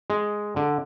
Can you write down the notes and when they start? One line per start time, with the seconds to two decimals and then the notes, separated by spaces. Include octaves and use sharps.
0.10 G#3
0.56 D3